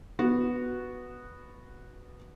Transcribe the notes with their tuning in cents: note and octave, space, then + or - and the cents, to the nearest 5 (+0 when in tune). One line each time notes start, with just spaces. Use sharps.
B3 +0 F#4 -5